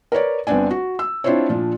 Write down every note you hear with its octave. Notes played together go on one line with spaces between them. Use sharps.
A#4 B4 C#5 D5
G1 B3 C4 D4 D5 G#5
F#4
E6
C4 D4 E4 F4 C5 C#5
A#2 F3 D4